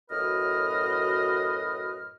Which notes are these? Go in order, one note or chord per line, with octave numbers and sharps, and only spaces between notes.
F#2 A2 F#4 B4 D#5 F6